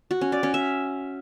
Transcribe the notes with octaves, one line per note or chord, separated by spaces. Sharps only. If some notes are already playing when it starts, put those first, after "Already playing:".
F#4
C#4
D5
C#4
E5